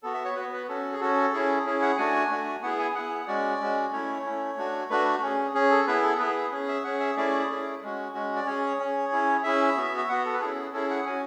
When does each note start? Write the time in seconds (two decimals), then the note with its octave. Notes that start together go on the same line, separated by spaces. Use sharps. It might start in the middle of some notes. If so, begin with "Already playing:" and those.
0.03 B3 F#4 A4
0.14 E5
0.25 C#5
0.36 B3 F#4 B4
0.53 B4
0.69 C#4 F#4 A4
0.92 G#4
1.00 C#4 F#4 A4
1.33 C#4 E4 G#4
1.66 C#4 E4 G#4
1.82 F#5
1.97 A3 D4 F#4 G#5
2.31 A3 D4 F#4
2.62 B3 E4 G#4 F#5
2.79 G#5
2.95 B3 E4 G#4 F#5
3.27 G#3 C#4 F#4 D5
3.61 G#3 C#4 F#4
3.92 A3 C#4 E4 C#5
4.25 A3 C#4 E4
4.57 A3 D4 F#4
4.89 A3 D4 F#4 B4
5.22 C#4 G#4
5.54 C#4 G#4
5.70 A4
5.87 B3 E4 G#4 B4
6.03 A4
6.19 B3 E4 G#4 B4
6.51 C#4 G#4
6.68 E5
6.84 C#4 G#4 F#5
7.00 E5
7.17 A3 C#4 E4 G#4 D5
7.50 A3 C#4 E4 G#4
7.82 G#3 C#4 F#4
8.14 G#3 C#4 F#4
8.36 D5
8.46 C#4 G#4 C#5
8.79 C#4 G#4
9.12 C#4 E4 G#4
9.43 C#4 E4 G#4 E5
9.77 B3 F#4
9.98 E5
10.09 B3 F#4 F#5
10.25 A4
10.34 B4
10.41 C#4 E4 G#4 A4
10.73 C#4 E4 G#4 A4
10.90 F#5
11.06 C#4 F#4 G#5